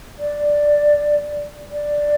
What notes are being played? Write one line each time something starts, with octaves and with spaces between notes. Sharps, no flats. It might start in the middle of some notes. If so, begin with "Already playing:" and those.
D5
D5